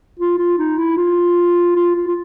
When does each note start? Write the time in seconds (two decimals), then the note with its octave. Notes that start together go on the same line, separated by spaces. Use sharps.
0.20 F4
0.38 F4
0.58 D#4
0.78 E4
0.97 F4
1.76 F4
1.95 F4
2.08 F4